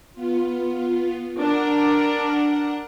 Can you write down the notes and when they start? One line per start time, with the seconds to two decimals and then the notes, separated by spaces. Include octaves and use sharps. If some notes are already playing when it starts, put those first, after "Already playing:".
0.13 B3 F4
1.38 D4 A#4 F#5